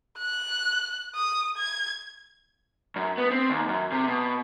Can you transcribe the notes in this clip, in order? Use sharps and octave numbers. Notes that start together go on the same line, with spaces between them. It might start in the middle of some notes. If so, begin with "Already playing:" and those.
F#6
D#6
G#6
F#2
B3
C4
D#2
F#2
C3
B2